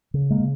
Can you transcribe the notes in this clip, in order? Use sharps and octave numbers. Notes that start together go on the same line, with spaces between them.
C#3
G#3 A#3
C#3